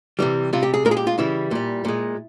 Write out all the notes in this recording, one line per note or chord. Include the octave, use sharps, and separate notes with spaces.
C3 E3 G3
C3 G3 F4
G4
G#4
A#2 G#3 A#4
G#4
G4
F4
C#3 E3 G3 E4
A#2 G3
A#2 G#3